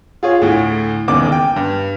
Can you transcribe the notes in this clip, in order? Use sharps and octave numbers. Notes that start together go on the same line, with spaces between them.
F4 G#4 C#5
D2 A2
E1 D#2 C#3 D6
G5
G2